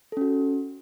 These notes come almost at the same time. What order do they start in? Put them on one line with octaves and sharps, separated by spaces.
A4 C#4 F#4